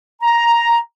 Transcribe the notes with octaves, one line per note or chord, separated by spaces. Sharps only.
A#5